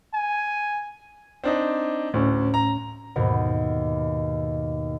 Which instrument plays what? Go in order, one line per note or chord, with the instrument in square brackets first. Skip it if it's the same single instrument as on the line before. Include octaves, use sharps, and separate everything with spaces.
[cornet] G#5
[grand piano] C4 D4 D#4
[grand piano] D2 [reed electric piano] A2 C#4
[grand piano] A#5
[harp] D#2 G#2 B2